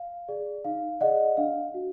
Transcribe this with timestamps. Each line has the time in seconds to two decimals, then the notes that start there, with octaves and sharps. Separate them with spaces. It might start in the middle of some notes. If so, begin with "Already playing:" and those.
Already playing: F5
0.28 G#4 D5
0.65 D#4 F5
1.01 G#4 D5 D#5 F#5
1.37 D4 F5
1.74 F#4